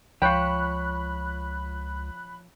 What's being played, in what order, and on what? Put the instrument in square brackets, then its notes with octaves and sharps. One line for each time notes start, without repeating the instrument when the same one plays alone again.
[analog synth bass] C#2 [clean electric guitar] F3 C#5 [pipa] F4 G5 [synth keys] B5 F#6